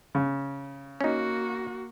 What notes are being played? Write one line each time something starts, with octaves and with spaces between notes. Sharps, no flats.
C#3
A#3 C#4 D#4 F#4